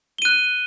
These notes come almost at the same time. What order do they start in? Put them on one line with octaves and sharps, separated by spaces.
G7 D#7 F#6